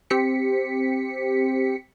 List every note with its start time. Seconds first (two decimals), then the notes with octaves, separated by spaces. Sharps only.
0.10 C4 G4 B6 C#7